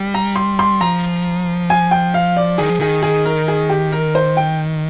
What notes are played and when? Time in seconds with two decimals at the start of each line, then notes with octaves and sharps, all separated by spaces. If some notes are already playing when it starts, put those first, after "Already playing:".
Already playing: G3
0.14 A#5
0.36 C6
0.59 C6
0.81 F3 A#5
1.70 G#5
1.91 G5
2.14 F5
2.37 D5
2.58 D#3 G#4
2.69 F3
2.80 D#3 G#4
3.03 G#4
3.25 A#4
3.48 G#4
3.70 G4
3.92 A#4
4.15 C5
4.37 G5